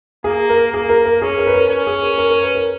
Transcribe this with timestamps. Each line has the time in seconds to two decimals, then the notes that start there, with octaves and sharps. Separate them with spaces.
0.24 A#3 G#4
0.49 A#4
0.73 A#3 G#4
0.89 A#4
1.05 A#4
1.22 C#4 G#4
1.38 A#4
1.47 B4
1.54 A#4
1.69 C#4 A#4
1.87 G#4
2.03 A#4
2.18 A#4
2.30 A#4
2.42 B4
2.55 A#4